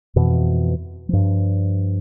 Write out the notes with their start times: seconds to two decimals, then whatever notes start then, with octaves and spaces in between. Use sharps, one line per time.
0.16 F2 B2 E3
1.09 G2 F3